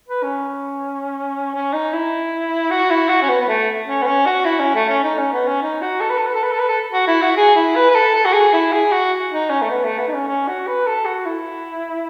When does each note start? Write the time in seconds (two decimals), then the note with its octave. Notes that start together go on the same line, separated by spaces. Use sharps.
0.08 B4
0.23 C#4
1.54 C#4
1.73 D#4
1.93 E4
2.71 F#4
2.90 E4
3.09 F#4
3.22 C#4
3.29 B3
3.40 B3
3.48 A3
3.87 C#4
4.02 B3
4.07 C#4
4.26 F#4
4.45 E4
4.60 C#4
4.75 A3
4.89 C#4
5.03 D#4
5.18 C#4
5.32 B3
5.47 C#4
5.62 D#4
5.81 F#4
6.01 A4
6.09 B4
6.17 A4
6.26 B4
6.34 A4
6.43 B4
6.51 A4
6.59 B4
6.68 A4
6.92 F#4
7.07 E4
7.22 F#4
7.37 G#4
7.55 E4
7.76 B4
7.90 B4
7.95 A4
8.15 A4
8.25 F#4
8.33 G#4
8.53 E4
8.72 G#4
8.92 F#4
9.31 D#4
9.50 C#4
9.62 A3
9.70 B3
9.84 A3
9.98 B3
10.08 D#4
10.13 C#4
10.27 C#4
10.48 F#4
10.67 B4
10.86 A4
11.06 F#4
11.25 E4